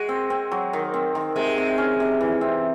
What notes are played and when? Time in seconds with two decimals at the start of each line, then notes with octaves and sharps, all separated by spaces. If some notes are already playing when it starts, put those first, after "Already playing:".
Already playing: G#3 F#4
0.09 C4
0.30 C4
0.51 F#3
0.73 D#3
0.94 C4
1.15 D#3
1.36 C3 G#3
1.58 C3
1.78 C#4
2.00 C3
2.21 E3
2.41 C4